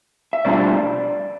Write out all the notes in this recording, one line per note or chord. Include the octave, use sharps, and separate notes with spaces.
E5
B2 G3 D4 F4 D5